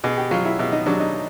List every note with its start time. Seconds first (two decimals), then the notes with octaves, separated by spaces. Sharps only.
0.04 B2 G#4
0.18 G4
0.31 F#3 F4
0.45 E4
0.59 B2 E4
0.72 D#4
0.86 F#3 D4
1.00 D#4